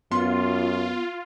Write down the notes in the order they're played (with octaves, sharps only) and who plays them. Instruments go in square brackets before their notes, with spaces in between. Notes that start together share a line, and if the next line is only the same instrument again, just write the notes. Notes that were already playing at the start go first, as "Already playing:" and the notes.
[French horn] F#2 [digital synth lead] B3 [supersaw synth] F4 [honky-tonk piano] C6